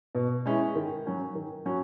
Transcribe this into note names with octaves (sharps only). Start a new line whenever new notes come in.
B2
G#3 C#4 E4
D#3
F#3 C#4 F#4
D#3
F#3 C#4 F#4